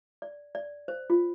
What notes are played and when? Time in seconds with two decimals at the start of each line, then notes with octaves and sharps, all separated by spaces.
0.22 D5
0.55 D5
0.88 C5
1.10 F4